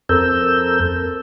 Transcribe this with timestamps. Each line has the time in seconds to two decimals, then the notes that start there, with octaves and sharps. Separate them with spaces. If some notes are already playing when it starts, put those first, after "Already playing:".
0.09 F2 C4 A4 A#4 E6 G6